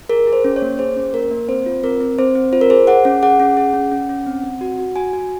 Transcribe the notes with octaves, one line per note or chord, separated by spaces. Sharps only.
G#4 A#4
G#4
C5
C#4
C#5
A#3
G#4 C5
C#4
A#3 A#4
A#3
C4 C5
F4
C4 A#4
C4
C4 C5
C4
F4 C5
A#4
G#4 C5
G#4 F#5
C#4
G#4 F#5
C#4
G#4
C#4
C#4
C#4
C4
C4
F#4
F#4
F#4 G#5
F#4